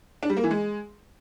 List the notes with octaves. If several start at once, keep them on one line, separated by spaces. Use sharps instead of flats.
D4
G3
A#3
E3
G#3